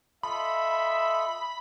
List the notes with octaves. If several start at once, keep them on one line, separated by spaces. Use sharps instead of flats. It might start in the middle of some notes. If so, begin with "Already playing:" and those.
F4 A4 D#5 E5 B5